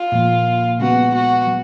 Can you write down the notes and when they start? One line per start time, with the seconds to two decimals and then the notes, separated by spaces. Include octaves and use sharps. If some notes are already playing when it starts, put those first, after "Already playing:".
Already playing: F4
0.12 A#2 F3 A#3
0.80 C#3 F3 G#3 B3 F#4
1.14 F#4
1.47 F#3